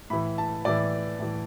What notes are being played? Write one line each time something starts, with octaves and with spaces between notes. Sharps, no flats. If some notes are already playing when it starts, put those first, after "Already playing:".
A2 E3 B5
A5
A2 E3 D5
A2 E3